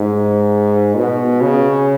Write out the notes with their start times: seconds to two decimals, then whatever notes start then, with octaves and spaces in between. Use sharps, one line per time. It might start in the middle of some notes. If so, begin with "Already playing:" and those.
Already playing: G#2
0.95 B2
1.41 C#3